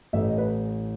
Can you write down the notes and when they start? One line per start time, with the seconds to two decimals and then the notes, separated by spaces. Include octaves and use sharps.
0.13 A1 A2 E3 A3 E5
0.28 D#5
0.38 B4